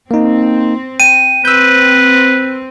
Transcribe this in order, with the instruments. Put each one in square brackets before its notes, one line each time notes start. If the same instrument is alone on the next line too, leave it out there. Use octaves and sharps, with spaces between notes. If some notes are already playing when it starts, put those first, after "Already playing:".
[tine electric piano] A#3 D#4 [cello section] C4
[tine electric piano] G5 [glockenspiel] D#7
[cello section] C4 [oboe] B4 [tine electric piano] E6 G6